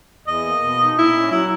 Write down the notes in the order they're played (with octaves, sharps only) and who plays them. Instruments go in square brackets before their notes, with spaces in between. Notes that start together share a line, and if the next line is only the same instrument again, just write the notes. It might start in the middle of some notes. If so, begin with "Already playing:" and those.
[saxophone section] E2 D#5
A#3
B2
D#4
A#2 E4
C#4
F#3 E4